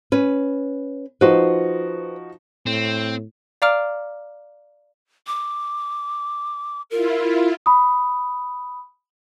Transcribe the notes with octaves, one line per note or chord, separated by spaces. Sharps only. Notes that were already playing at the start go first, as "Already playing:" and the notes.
C#4 B4
F3 D#4 F#4 B4 C5
A2 C4
D5 F5 A#5 D6 F6 D7
D6
E4 F4 A#4
B5 D#6